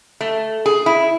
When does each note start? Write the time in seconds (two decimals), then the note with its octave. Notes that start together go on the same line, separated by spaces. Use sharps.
0.21 A3
0.66 G#4
0.86 E4